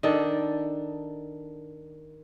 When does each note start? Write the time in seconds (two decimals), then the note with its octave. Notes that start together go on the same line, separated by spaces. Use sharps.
0.03 D#3 D4 A4